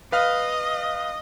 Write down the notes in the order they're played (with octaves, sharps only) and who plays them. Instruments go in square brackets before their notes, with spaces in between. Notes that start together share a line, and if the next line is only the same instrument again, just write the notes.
[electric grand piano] B4 F5 F6 [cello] D#5